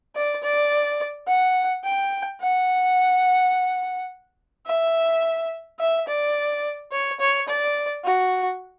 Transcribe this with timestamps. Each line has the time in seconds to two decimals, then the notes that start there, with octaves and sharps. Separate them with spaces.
0.15 D5
0.43 D5
1.27 F#5
1.84 G5
2.41 F#5
4.66 E5
5.80 E5
6.08 D5
6.92 C#5
7.20 C#5
7.48 D5
8.05 F#4